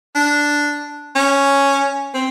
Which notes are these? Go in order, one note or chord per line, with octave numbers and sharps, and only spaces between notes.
D4
C#4
C4